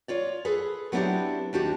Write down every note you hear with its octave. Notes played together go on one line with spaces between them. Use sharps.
F4 C#5 D5
G#4 A4 B4
F#3 B3 C4 D4 E4 G4
D#2 D4 F#4 G4